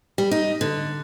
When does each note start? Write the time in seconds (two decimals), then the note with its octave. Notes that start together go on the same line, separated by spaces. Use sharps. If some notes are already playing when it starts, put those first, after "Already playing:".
0.18 G3
0.31 D#4
0.61 D3